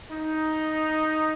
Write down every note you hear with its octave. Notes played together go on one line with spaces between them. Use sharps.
D#4